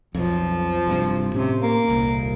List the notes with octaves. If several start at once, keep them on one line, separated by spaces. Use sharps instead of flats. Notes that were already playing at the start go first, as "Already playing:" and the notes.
B1 F2 F3
E1 G2 C3
A2 C3 C#4
A#3
D#1 C2